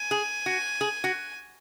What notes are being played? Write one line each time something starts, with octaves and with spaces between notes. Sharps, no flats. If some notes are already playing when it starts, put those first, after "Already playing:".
Already playing: G#5
G#4
F#4
G#4
F#4